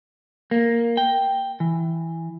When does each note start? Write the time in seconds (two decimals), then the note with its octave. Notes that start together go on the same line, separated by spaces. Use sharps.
0.51 A#3
0.97 G5
1.60 E3